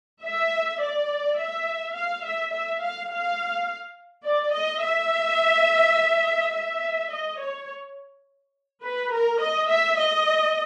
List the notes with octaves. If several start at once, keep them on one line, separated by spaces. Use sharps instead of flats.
E5
D5
E5
F5
E5
E5
F5
F5
D5
D#5
E5
E5
D#5
C#5
B4
A#4
D#5
E5
D#5